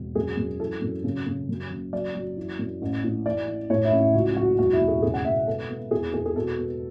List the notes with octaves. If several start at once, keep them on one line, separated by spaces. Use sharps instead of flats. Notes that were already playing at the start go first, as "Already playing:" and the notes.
Already playing: E1
F#2 G#4
F#2
E3 A4
F#2
C#3
C#3
F#2
F#1
F#3 D5
F#3
E3
F#2
A1
A2
E3 D5
E3
A2 C#5
E4
A1
E4
C#2 F#4
F#3 F#4
E1 F#4
E4
E1
G#4
C#3 G#4
F#5
E1 E5
B3 A4
B3
E2 G#4
E2 G#4
G#4
B2 A4
B3